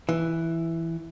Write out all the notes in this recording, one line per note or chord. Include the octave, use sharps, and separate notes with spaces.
E3